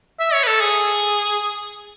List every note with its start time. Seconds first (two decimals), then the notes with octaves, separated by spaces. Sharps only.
0.19 E5
0.33 C#5
0.43 B4
0.47 A4
0.61 G#4